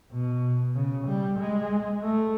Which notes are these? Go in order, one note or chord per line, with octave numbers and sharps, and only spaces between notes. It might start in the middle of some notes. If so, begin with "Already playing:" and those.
B2
C#3
G3
G#3
A3